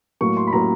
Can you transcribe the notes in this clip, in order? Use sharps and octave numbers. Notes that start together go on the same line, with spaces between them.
A2 F#3 A#3 C#6
C6
B5
A2 F#3 A#3 A#5